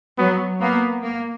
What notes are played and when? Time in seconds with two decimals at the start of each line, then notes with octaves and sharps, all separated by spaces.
0.18 F#3 B3
0.61 A#3 B3
1.03 A#3